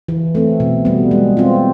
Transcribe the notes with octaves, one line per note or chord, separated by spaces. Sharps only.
E3
A3 C4
B2
G3 B3
G#3
C4 F4